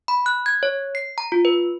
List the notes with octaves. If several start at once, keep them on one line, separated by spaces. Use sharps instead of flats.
B5
F#6
G#6
C#5
C7
A#5
F4
B4